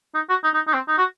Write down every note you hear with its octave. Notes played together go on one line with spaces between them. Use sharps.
D#4
F#4
D#4
D#4
D#4
C4
D#4
F#4